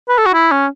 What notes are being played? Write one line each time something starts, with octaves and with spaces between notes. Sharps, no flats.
B4
A4
F#4
E4
C#4